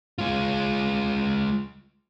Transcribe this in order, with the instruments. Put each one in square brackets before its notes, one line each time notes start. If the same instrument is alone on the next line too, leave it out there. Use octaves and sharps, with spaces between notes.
[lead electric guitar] G#3 F4